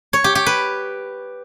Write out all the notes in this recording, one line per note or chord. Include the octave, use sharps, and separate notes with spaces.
C#5
G4
G4
B4